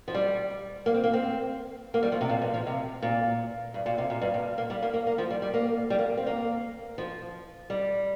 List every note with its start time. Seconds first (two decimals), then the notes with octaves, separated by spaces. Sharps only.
0.08 F3
0.14 G3
0.86 A#3
0.94 C4
1.04 A#3
1.13 C4
1.94 A#3
2.03 G3
2.12 F3
2.21 C3
2.29 A#2
2.42 G2
2.54 F3
2.67 C3
3.02 A#2
3.74 G2
3.86 A#2
3.98 C3
4.10 A#2
4.21 G2
4.34 A#2
4.58 A#3
4.70 G3
4.82 A#3
4.94 A#3
5.07 A#3
5.18 F3
5.30 G3
5.42 G3
5.54 A#3
5.90 G3
5.99 A#3
6.17 C4
6.27 A#3
6.98 F3
7.70 G3